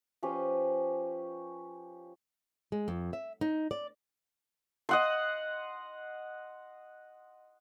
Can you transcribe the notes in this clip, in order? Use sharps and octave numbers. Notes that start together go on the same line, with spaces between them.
F3 C#4 G4 B4
G#3
F2
E5
D#4
D5
D#5 F#5 C6